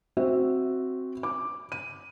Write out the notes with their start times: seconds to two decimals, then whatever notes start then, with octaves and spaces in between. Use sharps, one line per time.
0.17 C4 F#4 C5 E5
1.23 D6
1.72 D#7